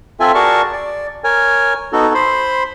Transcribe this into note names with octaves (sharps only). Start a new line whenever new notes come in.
C4 F4 A4 E5 G#5
F#4 G#4 A#4 D5 A5 C#6
D5
A#4 C#5 G#5
B3 D#4 F#4 A4
C5 B5 C6